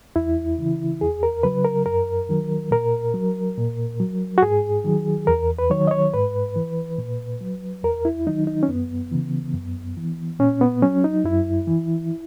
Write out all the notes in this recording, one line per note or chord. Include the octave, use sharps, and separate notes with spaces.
E2 E4
C#3 E3
E2 G#4
A#4
C#3 F#3 B4
A#4
F#2 A#4
D#3 F#3
A#2 A#4
F#3
A#2
F#3
F#4
G#2 G#4
D#3 F#3
E2 A#4
B4
D#3 F#3 C#5
D#5
C#5
G#2 B4
E3
A#2
F#3
E2 A#4
E4
D#3 F#3 D#4
D#4
C#4
F#2 B3
C#3 E3
F#2
E3
A#2 C#4
B3
F#3 C#4
D#4
F#2 E4
E3